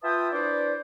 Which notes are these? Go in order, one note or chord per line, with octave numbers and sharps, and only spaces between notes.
F4 B4 E5 G5 A5 D#6
D4 E4 B4 C5 D5